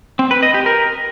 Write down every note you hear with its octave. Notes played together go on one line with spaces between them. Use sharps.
C4
B4
D#5
G4
A#4